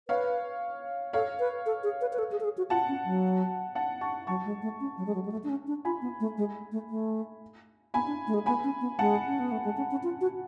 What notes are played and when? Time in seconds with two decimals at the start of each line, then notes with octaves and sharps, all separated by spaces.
0.08 B4 C#5 F5
1.13 A4 C#5 F5
1.40 B4
1.66 A4
1.83 G#4
2.01 B4
2.13 B4
2.19 A4
2.32 G#4
2.40 A4
2.44 G#4
2.58 F#4
2.70 F4 F#5 A5
2.89 C#4
3.05 F#3
3.75 F#5 A5
4.01 A5 C#6
4.27 F#3 A5 C#6
4.45 G#3
4.62 A3
4.80 C#4
4.98 F#3
5.06 G#3
5.15 F#3
5.25 G#3
5.32 A3
5.44 D4
5.49 C#4
5.67 D4
5.85 F4 G#5 B5
6.02 B3
6.20 A3
6.38 G#3
6.72 A3
6.90 A3
7.94 B3 G#5 B5
8.07 D4
8.27 A3
8.34 G#3
8.46 B3 G#5 B5
8.64 C#4
8.81 B3
8.99 G#3 F#5 A5
9.27 C#4
9.40 B3
9.52 A3
9.65 G#3
9.77 C#4
9.91 C#4
10.03 F4
10.21 F#4